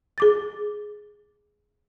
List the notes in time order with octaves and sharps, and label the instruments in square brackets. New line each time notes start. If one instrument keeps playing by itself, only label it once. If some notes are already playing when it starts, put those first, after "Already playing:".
[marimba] G#4 D6 A6